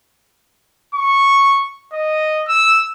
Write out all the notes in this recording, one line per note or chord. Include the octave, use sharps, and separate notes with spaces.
C#6
D#5
E6